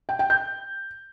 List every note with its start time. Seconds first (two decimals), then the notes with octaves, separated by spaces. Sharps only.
0.09 G5
0.19 G5
0.30 G6